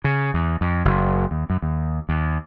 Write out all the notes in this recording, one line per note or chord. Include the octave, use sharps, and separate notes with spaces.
C#3
E2
F2
F#1
D#2
F#2
D#2
D#2